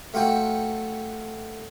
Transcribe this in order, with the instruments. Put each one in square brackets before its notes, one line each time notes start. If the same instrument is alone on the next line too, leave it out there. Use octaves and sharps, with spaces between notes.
[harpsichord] A3 F4 F#4 G5 A5